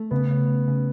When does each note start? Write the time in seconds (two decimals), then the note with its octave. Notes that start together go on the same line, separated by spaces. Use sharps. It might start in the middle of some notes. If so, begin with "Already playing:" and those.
Already playing: A3
0.11 C#3 B3
0.30 C#3
0.48 C#3
0.68 C#3